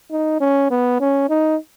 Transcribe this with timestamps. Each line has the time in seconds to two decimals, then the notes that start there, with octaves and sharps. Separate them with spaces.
0.11 D#4
0.40 C#4
0.70 B3
1.00 C#4
1.30 D#4